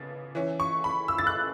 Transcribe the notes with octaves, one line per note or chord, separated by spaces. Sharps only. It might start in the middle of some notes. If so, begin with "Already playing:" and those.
Already playing: C#3 B3 A6
E3 C#4
C#6
B5
E6
A6
F#6